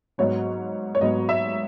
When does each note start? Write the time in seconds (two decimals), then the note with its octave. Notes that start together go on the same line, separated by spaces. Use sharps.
0.18 G#2 F#3 B3 C#5
0.95 C#5
1.01 G#2 F#3 B3 D#5
1.29 E5